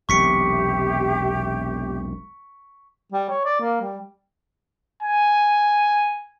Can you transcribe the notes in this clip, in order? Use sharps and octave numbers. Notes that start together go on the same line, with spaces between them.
E1 B1 C3 G4 E5 C#6 B6 C#7
G3
C#5
D5
A#3
G3
G#5